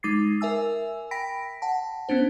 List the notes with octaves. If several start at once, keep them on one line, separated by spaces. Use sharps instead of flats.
G#3 D#4 D6 A6 C7
A#4 E5 G#5 E6
G5 B5 A#6 B6 D7
F#5 A5
B3 C#4 D4 C5